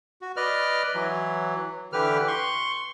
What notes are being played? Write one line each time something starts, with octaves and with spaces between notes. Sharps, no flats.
F#4
B4 D5 D#5 F6
E3 F#3
D3 E3 G4 B4 F6
C6 C#6